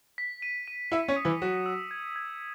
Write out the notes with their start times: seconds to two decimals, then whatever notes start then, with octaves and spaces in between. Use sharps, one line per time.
0.18 B6
0.42 D#7
0.68 D#7
0.92 E4 E5 C#7
1.08 C#4 C#5
1.16 D#6
1.25 E3 E4
1.42 F#3 F#4 E7
1.66 E6
1.91 G#6
2.16 G#6